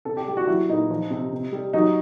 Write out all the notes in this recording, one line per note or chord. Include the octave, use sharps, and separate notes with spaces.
C3 A4
G4
G3 G4
F#4
F#3 E4
A#2 D#4
F3
C3
C3
G3
F#3 D#4